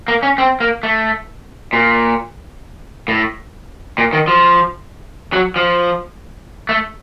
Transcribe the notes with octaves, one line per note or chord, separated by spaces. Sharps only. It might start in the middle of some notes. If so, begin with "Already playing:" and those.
A#3
C#4
C4
A#3
A3
A#2
A2
A#2
D#3
F3
F#3
F3
A3